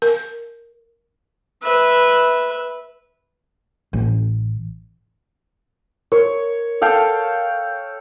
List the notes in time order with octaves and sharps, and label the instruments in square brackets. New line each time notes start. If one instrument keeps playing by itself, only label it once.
[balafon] A#4
[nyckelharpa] B4 E5
[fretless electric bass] A1
[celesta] A#4 [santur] C#5
[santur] A4 F5 G5